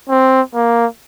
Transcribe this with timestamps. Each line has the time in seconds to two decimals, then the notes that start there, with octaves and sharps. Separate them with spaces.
0.10 C4
0.54 A#3